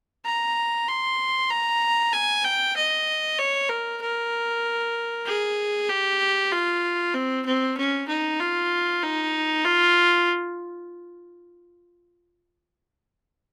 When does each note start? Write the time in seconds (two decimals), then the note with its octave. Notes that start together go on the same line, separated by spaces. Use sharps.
0.25 A#5
0.88 C6
1.50 A#5
2.12 G#5
2.44 G5
2.76 D#5
3.39 C#5
3.69 A#4
4.01 A#4
5.26 G#4
5.89 G4
6.51 F4
7.14 C4
7.45 C4
7.77 C#4
8.08 D#4
8.39 F4
9.03 D#4
9.65 F4